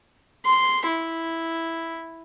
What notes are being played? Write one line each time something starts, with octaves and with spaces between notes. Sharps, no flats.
C6
E4